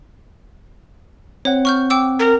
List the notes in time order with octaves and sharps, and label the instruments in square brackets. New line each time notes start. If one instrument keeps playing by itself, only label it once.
[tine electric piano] C4 F#5 [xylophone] C#5
[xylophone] C#6 F6 G6
G5 D6 E6
[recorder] A#4